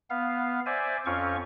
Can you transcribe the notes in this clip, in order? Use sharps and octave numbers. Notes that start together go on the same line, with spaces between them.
B3 F5
C5 D5 E5 G#5
F2 C4 C#4 F4 C#6